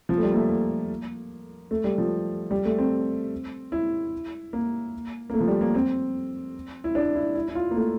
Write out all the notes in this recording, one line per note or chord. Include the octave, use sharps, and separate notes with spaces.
F3
A3
G3
A#3
A3
A#3
A3
G3
F3
G3
A3
C4
E4
A#3
A#3
A3
F3
G3
A#3
C4
E4
D4
E4
E4
E4
F4
A#3
A3